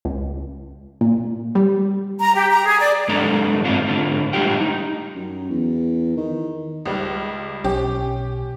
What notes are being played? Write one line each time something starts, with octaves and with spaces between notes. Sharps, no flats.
C#2
A#2
G3
A#5
G4
A#5
G#4
D5
G2 D#3 G#3 D4 A4 A#5
G#2 A3 C4 D4 F4
G#2 D3 F4
A2 G3 D4 F4 G4 G5
D#4
F#2
E2
D#3
C#2 G3
B1 C#4 G4